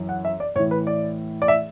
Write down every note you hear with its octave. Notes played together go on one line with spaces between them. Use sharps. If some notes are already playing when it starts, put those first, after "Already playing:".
Already playing: F#2 E3
F#5
E5
D5
A2 E3 C#5
B4
D5
D5
E5